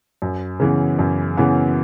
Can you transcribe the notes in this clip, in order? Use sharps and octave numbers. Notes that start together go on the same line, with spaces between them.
F#2
C#3 E3 B3
F#2
C#3 E3 B3